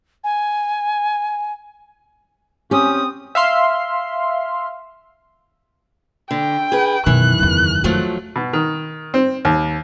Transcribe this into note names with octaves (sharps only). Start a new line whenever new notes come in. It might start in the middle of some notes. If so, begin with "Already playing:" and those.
G#5
C4 C#4 G4 D#6
E5 F5 C6
D3 G5
G#4 B4
F#2 B2 D#3 E3 F#6
E2 C#3
F3 F#3 A3 F4
B2
D#3
C4
D#2